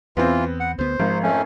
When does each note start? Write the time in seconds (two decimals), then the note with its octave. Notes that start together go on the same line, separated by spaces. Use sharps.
0.17 E2 E3 B3 C4 F4
0.60 F#5
0.79 D2 B3 C5
0.99 G#1 F3 G#3
1.23 F2 A3 C#4